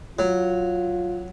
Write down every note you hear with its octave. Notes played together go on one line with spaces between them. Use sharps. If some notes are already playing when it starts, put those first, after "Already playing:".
F#3 F4